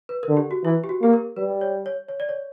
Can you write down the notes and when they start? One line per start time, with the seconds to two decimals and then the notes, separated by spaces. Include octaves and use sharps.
0.09 B4
0.23 A#4
0.29 D3
0.37 G4
0.51 F#4
0.64 E3 E4
0.84 G4
0.89 F#4
1.02 A#3 G4
1.13 A#4
1.36 G3 B4
1.61 C#5
1.86 C#5
2.09 C#5
2.20 D5
2.29 C#5